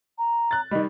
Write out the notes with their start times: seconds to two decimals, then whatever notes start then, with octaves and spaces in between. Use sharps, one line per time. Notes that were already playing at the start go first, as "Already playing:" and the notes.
0.18 A#5
0.51 F#6 A6
0.71 D#3 G3 D#5